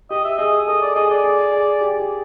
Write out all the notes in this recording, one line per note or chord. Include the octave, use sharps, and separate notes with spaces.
G4 D#5
E5
G#4 D#5
A4 D#5
D5
G#4 D#5
D5
G#4
G#4
G4
G4